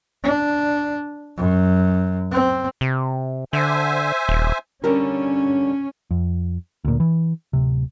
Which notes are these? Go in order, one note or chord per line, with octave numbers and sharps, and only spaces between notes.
D4
F#2
C4
C3
D3 C5 E5 G#5
D#1
D3 G3 C#4 A#4
F2
D2 A#2
E3
D1 C3